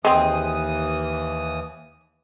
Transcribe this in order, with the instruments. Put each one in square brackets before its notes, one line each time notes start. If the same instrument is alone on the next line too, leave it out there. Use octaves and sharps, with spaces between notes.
[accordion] D#2 E3 D#6 [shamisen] G#3 C4